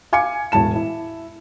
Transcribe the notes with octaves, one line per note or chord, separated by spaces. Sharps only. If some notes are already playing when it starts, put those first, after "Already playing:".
F5 G#5 D6 G#6 C#7
E1 A2 A5 E7
E4